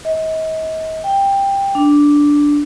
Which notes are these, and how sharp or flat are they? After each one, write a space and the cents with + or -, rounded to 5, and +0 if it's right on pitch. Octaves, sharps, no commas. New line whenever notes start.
D#5 +40
G5 +10
D4 -5